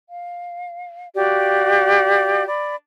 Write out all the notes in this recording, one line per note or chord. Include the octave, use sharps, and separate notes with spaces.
F5
F#4 G4 D5 F5
D5 B5